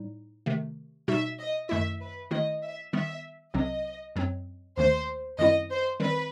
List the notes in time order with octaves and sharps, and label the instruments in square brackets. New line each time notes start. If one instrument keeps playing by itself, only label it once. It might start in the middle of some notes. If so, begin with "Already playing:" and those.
Already playing: [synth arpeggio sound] A2 G3 D#4
C3 D#3 A3
[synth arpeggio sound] B2 G3 D#4 F#4 [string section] E5
[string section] D#5
[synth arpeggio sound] F#2 D#3 A3 E4 [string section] E5
[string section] B4
[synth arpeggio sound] D#3 A3 E4 [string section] D#5
[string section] E5
[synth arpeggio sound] D#3 G3 B3 [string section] E5
[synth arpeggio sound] C2 C3 F#3 C4 [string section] D#5
[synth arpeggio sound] F#2 F#3 C4
[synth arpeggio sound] D#2 D#3 A3 [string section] C5
[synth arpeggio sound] F#2 D#3 G3 C4 E4 [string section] D#5
[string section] C5
[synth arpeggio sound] D#3 G3 C4 [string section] B4